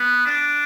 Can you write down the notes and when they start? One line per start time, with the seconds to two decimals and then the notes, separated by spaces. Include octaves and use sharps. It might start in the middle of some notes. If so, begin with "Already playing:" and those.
Already playing: B3
0.25 D4